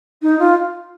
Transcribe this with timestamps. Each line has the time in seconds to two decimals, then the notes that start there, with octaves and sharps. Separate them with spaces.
0.22 D#4
0.39 F4